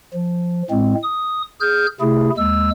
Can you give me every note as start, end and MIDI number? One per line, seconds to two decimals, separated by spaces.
0.14 0.62 53
0.70 0.94 45
0.70 0.94 56
0.70 0.94 60
1.03 1.42 87
1.61 1.87 68
1.61 1.87 89
1.61 1.87 91
2.01 2.30 48
2.01 2.30 57
2.01 2.30 64
2.01 2.30 68
2.37 2.70 39
2.37 2.70 56
2.37 2.70 88